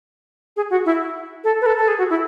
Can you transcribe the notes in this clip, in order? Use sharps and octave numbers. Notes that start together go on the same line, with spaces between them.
G#4
F#4
E4
A4
B4
A4
A4
G#4
F#4
E4